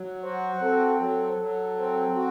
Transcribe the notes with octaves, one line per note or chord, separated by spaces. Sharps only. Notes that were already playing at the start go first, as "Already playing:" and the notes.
Already playing: F#3
F#4 C5
C4 A4
F#3 A4
F#3
C4
F#4